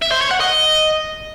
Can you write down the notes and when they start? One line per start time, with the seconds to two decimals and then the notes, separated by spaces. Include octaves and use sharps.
0.02 E5
0.12 C5
0.21 C#5
0.31 F#5
0.40 D#5